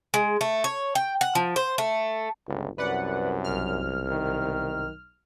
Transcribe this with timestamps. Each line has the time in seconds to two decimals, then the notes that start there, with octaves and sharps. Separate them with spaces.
0.14 G#3
0.41 A3
0.64 C#5
0.95 G5
1.21 F#5
1.35 F3
1.56 C5
1.78 A3
2.48 G1 C#2
2.78 C2 F#2 B4 D5 F#5
3.44 B1 F6
4.11 D#3